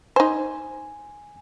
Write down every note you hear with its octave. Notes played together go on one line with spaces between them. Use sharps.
D#4 C5 G#5